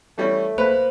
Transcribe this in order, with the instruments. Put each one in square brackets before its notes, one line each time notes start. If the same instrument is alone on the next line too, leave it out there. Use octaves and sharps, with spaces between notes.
[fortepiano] E3 G3 C#4 [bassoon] A3
[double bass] A#3 [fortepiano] B4 B5 [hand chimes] C5